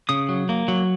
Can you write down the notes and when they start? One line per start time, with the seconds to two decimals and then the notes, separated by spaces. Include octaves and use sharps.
0.09 C#3 D#6
0.29 F#3
0.49 A#3
0.68 F#3